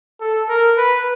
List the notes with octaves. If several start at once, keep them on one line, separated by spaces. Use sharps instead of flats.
A4
A#4
B4